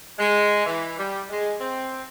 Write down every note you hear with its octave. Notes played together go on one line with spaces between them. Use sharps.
G#3
E3
G3
G#3
C4